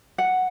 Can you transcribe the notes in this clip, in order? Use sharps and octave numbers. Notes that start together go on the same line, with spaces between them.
F#5